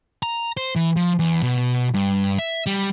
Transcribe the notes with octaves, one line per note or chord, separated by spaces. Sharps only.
A#5
C5
E3
F3
E2
B2
G2
E5
G3